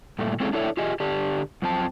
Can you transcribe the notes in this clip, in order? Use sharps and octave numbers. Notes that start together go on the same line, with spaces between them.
G2 A#2 A3
G#3 C4 C#4 E4 G#4 A4
D4 E4 A4 C#5 D5 E5
F4 G4 G#4 D#5
D3 D4 G4
F#2 F3 C4 A5